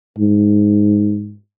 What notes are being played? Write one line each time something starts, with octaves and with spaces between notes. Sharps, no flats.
G#2